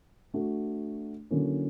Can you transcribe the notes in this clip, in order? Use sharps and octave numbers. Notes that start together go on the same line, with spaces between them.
A3 D4 F#4
D3 F#3 A#3 C#4 E4